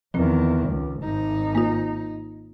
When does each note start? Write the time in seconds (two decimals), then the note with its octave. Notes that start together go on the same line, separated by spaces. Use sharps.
0.14 E2 D#3 F3 C4
0.69 C#2
1.03 G#1 D#4
1.55 A#3 F4